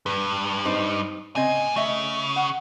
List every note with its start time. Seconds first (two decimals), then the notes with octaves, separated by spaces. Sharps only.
0.06 G2 B4
0.65 C4 D#4 C5
1.36 A#2 C#3 C4 D#5 G#5
1.76 C#3 A3 D#5 E5
2.36 F#5